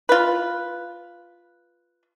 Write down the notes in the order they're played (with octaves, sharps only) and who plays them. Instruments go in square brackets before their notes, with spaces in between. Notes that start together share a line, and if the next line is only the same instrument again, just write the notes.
[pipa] F4 B4